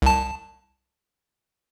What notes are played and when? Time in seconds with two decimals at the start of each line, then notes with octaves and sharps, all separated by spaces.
0.02 C2 A5